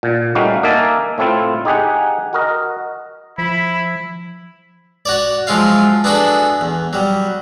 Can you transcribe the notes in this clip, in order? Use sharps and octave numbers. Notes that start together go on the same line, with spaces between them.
A#2
G3 A3 C#4 D#4 F#4 F5
A#3 D#4 A#4 E5 G#5 A5
A2 A3 C4 E4 F4
D#4 G4 G#4 F#5
F#4 A#4 D#5
F3 E4 B5
F#4 C#5 D5
F3 F#3 G#3 E4 F4 F5
B3 D4 E4 F#4 G#4 A4
E2
F#3 G3